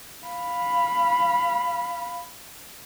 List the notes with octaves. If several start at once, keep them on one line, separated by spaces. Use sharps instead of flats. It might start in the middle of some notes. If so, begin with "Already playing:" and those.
F5 B5